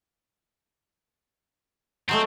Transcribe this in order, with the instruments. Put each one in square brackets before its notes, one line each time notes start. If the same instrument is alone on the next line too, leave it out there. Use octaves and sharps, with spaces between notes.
[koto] F#3 G#3 A3 [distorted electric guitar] C4